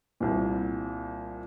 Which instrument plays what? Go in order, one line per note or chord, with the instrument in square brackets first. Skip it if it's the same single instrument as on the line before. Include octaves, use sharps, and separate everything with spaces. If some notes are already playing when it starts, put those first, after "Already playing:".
[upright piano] C2 A#2